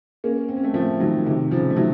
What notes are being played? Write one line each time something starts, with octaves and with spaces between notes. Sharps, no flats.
A#3 C#4
C4
C#4
A3 C4
F3 A3
D#3 F#3
C3 D#3
C#3 F3
A3
D#3 F#3